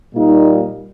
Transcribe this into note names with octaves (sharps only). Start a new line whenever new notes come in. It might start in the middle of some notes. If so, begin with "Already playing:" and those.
A#2 G3 A#3 D#4